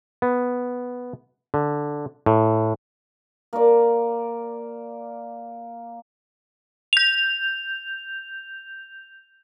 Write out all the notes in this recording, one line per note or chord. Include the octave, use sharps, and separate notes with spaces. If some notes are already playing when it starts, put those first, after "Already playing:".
B3
D3
A2
A#3 D5
G6 F7